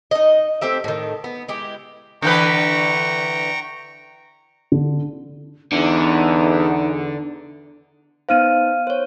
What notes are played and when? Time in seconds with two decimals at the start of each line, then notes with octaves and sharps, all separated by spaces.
0.11 D#4 D#5
0.61 A3 C4 G4 E5
0.84 A2 D#3
1.24 B3
1.48 G#3 E4 G4
2.22 D3 E3 B4 G5 A#5 C#6
4.72 D3
5.72 E2 D3 D#4
8.29 B3 D#4 C5 F5 F6 D#7
8.87 C5 C#5